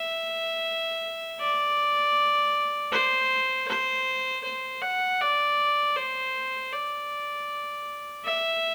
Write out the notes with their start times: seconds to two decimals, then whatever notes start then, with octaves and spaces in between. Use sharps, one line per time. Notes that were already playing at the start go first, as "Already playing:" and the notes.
Already playing: E5
1.39 D5
2.92 C5
3.68 C5
4.44 C5
4.81 F#5
5.21 D5
5.96 C5
6.73 D5
8.25 E5